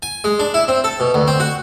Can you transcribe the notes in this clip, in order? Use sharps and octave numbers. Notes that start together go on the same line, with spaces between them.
G#5
G#3
D4
E4
C4
A4
B2
D2
C4
F#4